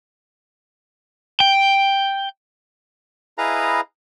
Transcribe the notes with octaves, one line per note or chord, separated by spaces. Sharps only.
G5
E4 G#4 B4 D#5 F5 A#5